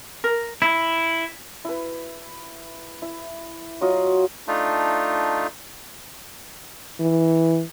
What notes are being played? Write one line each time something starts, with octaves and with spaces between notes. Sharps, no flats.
A#4
E4
E4 B4
E4
F#3 F4 F#4 D#5
A3 D4 D#4 F4
E3